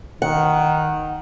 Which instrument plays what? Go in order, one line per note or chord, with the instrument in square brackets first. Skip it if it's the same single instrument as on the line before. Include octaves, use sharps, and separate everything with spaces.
[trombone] D#3 [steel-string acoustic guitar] F#5